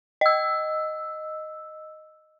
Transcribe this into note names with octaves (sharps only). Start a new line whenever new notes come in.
D#5 E6